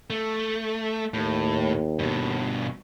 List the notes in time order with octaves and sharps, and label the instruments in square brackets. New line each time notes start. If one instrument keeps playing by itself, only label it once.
[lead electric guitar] A3
[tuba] D#2 [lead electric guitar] A2
[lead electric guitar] G2 B2